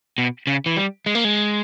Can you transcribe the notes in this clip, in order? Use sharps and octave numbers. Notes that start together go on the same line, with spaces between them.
B2
C#3
E3
G3
G#3
A#3
G#3